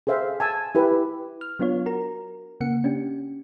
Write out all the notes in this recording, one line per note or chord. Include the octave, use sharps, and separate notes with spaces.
G#4 A4 C5 E5 F5
G#5 A5 E6
E4 G4 B4
F6
F#3 B3 D4 F4 C#5
F#4 A#4 A#5
C#3 A#3 F#5 C#7
C#4 D4 G4